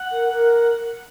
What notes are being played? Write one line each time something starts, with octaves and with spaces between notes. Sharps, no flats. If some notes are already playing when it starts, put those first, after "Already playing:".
Already playing: F#5
A#4
A#4